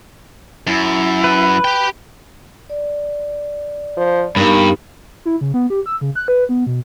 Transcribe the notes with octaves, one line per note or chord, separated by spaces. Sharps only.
F#2 E4
B4
G4 G5
D5
F3
G2 A#3 B3 D#4 G4
E4
C#3
B3
G4
E6
C#3
F#6
B4
B3
B2